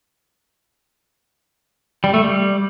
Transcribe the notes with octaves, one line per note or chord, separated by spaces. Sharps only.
G3
A3
G3